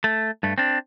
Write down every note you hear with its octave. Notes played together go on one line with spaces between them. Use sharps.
A3
G2 A3
C4 D4